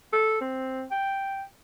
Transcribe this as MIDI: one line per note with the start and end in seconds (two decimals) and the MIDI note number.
0.13 0.39 69
0.41 0.84 60
0.91 1.42 79